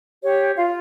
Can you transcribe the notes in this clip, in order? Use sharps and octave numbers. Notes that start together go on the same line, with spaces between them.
G4 C#5
F4 F5